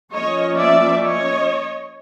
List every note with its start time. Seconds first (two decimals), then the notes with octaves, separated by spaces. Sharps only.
0.13 F3 A#3 C#4 C#5 D#5
0.56 D5 E5
1.00 C#5 D#5